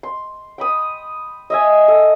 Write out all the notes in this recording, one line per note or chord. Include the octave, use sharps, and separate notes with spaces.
C6
G5 B5 D#6
D#5 E5 G#5
A4